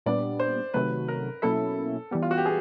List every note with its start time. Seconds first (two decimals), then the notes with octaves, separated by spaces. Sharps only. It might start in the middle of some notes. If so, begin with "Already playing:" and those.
0.06 A#2 G3 B3 D4 D5
0.40 C5
0.74 C3 D#3 F#3 A3 B4
1.08 A#4
1.42 B2 F#3 A#3 C#4 E4 A4
2.11 E3 G3 B3
2.22 F4
2.31 F#4
2.38 G4
2.45 G#4